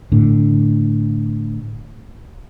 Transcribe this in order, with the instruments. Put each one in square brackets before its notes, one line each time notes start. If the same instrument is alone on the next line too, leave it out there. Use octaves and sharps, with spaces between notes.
[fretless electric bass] A2 D3